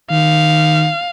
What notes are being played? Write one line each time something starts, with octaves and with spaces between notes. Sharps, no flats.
D#3 F5